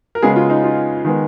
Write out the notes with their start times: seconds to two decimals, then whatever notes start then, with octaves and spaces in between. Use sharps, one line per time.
0.15 A#4
0.22 C#3 G#3 B3 G#4
0.36 F4
0.50 D#4
0.64 F4
1.05 D#3 G#3 B3